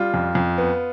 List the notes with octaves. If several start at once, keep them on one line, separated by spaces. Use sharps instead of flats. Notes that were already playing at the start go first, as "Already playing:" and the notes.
Already playing: G3 F4
F2
F2
B3